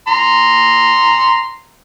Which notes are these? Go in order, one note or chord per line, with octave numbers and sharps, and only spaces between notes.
A#5 C6